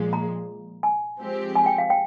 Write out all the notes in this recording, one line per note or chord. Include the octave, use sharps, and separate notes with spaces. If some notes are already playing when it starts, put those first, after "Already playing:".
Already playing: A#2 F3 G#3
A#5
G#5
F3 G#3 C4 G4
G#5
G5
F5
G5